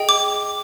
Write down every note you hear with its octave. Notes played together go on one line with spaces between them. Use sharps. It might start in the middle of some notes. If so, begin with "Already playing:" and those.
Already playing: G#4 D#5 G5
D6